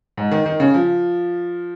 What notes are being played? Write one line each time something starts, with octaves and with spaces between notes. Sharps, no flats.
G#2
D#3
D#3
C#3
F3